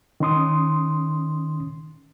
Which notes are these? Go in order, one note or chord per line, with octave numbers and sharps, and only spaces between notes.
D#3 C#4 C6 D#6